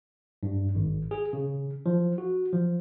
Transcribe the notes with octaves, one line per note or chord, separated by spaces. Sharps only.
G2
G#1
G#4
C#3
F3
F#4
F3